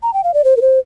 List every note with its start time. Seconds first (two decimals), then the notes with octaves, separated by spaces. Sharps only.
0.03 A#5
0.14 G5
0.24 F5
0.34 D5
0.44 C5
0.57 A#4
0.61 C5